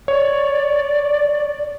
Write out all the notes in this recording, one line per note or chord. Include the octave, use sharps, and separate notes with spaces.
C#5 D5